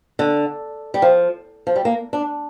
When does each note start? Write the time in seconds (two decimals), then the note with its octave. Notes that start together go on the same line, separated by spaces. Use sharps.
0.19 D3
0.94 G3
1.02 F3
1.67 F3
1.76 G3
1.85 A#3
2.13 D4